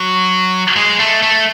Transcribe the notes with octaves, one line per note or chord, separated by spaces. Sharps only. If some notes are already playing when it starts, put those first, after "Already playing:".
Already playing: F#3
G#3
A3
A3